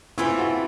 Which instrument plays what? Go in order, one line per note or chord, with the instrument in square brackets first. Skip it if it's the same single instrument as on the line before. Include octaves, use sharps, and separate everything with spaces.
[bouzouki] E3 A3 C4 F4 [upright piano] E4
[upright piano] F#4